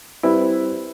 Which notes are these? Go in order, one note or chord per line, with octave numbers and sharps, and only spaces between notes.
G3 C4 E4 B4